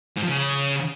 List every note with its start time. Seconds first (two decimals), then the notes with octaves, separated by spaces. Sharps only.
0.17 G#2
0.23 F3
0.29 C#3